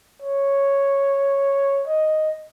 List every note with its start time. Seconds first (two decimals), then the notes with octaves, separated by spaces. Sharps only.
0.22 C#5
1.87 D#5